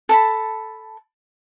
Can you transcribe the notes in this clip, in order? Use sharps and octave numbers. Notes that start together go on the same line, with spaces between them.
A4 A5 B5